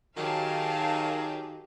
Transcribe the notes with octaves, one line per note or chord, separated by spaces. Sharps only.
D#3 F#3 G4 G#4 F5 A5